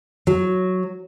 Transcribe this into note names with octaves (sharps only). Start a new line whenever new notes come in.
F#3